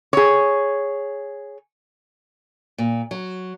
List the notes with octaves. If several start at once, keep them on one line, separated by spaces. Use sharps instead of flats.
G#4 C#5
A#2
F#3